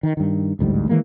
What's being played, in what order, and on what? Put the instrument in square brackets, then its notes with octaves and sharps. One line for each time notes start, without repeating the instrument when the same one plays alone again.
[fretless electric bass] D#3
G2 D#3
A1 D2 G#2 G3
D#3 E3 G#3 A#3